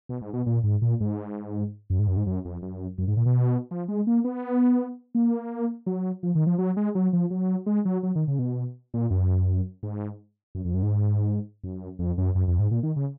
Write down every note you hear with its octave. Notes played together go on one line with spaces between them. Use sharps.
B2
G#2
B2
A#2
G#2
A#2
G#2
F#2
G#2
F#2
G#2
F#2
F2
F#2
F#2
G#2
A#2
B2
F3
G#3
A#3
B3
A#3
F#3
F3
D#3
F3
F#3
G#3
F#3
F3
F#3
G#3
F#3
F#3
D#3
C#3
B2
A#2
F#2
G#2
F#2
F2
F#2
G#2
F#2
F2
F#2
F#2
F2
G#2
A#2
D#3
C#3